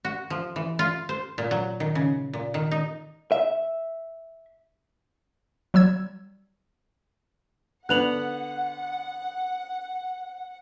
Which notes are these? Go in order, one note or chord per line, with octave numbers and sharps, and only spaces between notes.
F#4
F3
E3
F4
C5
A#2
F#3
D#3
C#3
A#2
D#3
D#4
E5
F#3 G3 E6 G#6
D3 B3 F#5 F#6 F7 F#7